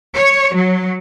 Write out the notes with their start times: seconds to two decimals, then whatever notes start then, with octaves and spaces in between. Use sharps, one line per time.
0.17 C#5
0.55 F#3